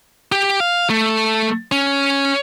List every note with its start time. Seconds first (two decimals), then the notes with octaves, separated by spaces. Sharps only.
0.32 G4
0.60 F5
0.90 A3
1.72 C#4